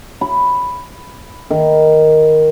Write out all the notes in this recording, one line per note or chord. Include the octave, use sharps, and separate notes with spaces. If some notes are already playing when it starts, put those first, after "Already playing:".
B5
D#3